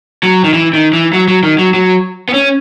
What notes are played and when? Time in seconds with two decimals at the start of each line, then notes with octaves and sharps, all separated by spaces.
0.23 F#3
0.44 D#3
0.53 E3
0.73 D#3
0.93 E3
1.13 F#3
1.28 F#3
1.43 D#3
1.59 F#3
1.74 F#3
2.29 B3
2.34 C#4